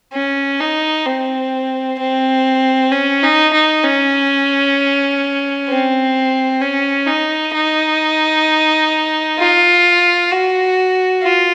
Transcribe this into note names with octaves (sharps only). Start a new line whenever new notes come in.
C#4
D#4
C4
C4
C#4
D#4
D#4
C#4
C4
C#4
D#4
D#4
F4
F#4
F4